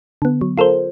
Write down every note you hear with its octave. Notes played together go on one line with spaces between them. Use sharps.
D3 B3
F#3
F4 A4 A#4 C5